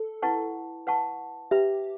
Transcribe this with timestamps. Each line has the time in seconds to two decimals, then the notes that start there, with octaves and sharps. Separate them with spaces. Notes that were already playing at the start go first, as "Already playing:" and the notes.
Already playing: A4
0.22 E4 B4 F#5 A5 C#6
0.87 B4 F#5 A5 C#6
1.51 G4 B4 E5 B5